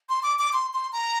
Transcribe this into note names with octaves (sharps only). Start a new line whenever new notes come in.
C6
D6
D6
C6
C6
A#5